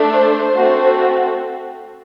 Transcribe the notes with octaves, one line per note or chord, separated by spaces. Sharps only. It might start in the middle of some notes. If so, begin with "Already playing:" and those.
Already playing: A3 D4 A4
C5
A3 C4 F#4 A4